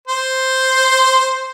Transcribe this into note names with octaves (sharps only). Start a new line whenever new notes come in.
C5